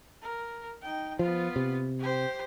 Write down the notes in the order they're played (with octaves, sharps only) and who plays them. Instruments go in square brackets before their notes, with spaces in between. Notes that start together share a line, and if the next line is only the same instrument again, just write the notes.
[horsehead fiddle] A#4
D#4 G5
[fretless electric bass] F3 [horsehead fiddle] B3 F4
[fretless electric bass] C3
[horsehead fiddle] G4 C5